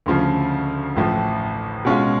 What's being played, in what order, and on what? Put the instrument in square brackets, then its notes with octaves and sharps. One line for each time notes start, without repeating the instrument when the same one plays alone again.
[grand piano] D2 C#3 F3
A1 A2 F3
B2 G#3 C#4 F4